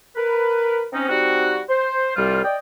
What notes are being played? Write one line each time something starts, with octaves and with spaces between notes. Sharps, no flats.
A#4 B4
C4 C#4 D#4
G3 C4 D#4 F#4
C5
C2 G3 F4
D5 D#5 G5